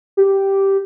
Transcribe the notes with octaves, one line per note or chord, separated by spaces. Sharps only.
G4